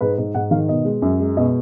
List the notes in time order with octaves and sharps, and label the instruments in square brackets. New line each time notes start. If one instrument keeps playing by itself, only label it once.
[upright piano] G#2 B4
G#2
G#2 F#5
D#3 F5
B2 D#5
G#3
F#2
G#3
B2 D#5